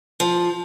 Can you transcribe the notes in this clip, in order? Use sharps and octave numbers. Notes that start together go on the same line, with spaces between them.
F3